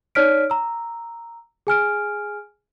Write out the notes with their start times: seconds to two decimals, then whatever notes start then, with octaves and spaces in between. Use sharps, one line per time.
0.15 D#4 C#5 D5 F6 B6 D7
0.50 A#5 E6
1.67 G#4 G#5 F6 D7